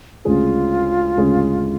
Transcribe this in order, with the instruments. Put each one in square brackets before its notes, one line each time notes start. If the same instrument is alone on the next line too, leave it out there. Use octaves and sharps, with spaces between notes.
[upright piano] D2 C#3 G#3 C#4 G#4 [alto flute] F4
[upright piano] D2 C#3 G#3 C#4 G#4